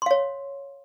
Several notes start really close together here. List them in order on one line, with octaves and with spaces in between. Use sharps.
C6 F5 C#5